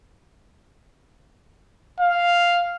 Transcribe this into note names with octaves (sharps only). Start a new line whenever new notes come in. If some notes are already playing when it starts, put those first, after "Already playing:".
F5